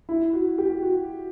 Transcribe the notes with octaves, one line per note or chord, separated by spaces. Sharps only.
E4
F#4
G4
F#4